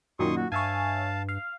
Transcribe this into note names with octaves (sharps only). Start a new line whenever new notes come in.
F#2 A#2 D#3 C6 C#6 D#6
F#4
G2 C#5 E5 F5 G#5 A5
F5